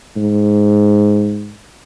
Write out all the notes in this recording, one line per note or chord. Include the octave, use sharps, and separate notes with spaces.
G#2